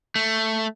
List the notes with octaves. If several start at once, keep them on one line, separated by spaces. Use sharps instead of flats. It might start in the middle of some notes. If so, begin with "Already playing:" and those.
A3